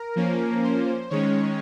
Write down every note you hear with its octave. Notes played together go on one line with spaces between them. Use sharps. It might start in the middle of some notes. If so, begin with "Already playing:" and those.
Already playing: A#4
F3 A#3 C#4
C5
D#3 G#3 C#4 C#5